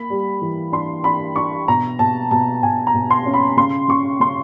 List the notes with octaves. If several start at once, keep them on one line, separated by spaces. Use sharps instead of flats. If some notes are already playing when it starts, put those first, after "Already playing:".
Already playing: A#3 B5
G3
E3
D4 C6
D4 B5
D4 C#6
B2 A#5
B2 A5
B2 A5
B2 G#5
A#5
B2
C6
C#4
B5
C#3 C6
C#3 C#6
C#3 C6